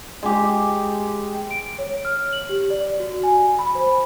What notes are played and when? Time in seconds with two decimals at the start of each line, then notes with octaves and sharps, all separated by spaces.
0.23 G#3 G4
1.51 D7
1.78 C#5
2.05 F6
2.33 F#7
2.49 G4
2.70 D5
3.00 F#4
3.23 G#5
3.59 B5
3.75 C5